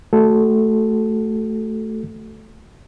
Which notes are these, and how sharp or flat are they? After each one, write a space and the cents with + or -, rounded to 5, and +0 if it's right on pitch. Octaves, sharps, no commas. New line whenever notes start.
A3 +0 F#4 +20 A4 -5